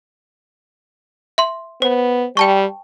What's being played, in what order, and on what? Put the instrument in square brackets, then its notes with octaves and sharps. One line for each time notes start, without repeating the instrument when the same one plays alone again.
[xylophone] E5 C6
[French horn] B3 [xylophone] C5
[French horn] G3 [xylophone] G5 A5 C#6